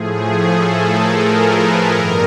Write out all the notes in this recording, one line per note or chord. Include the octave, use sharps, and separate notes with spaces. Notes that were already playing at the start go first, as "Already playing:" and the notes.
Already playing: A2 F3 A3 G#4
A4
A#4
B4
G2 D#3 G3 B3 A#4